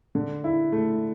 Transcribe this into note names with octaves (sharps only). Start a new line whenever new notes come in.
D3
E4
A3